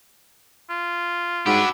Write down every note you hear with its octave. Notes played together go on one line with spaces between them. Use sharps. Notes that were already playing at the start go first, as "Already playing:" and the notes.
F4
G#2 D4 F#4 G4 B5 E6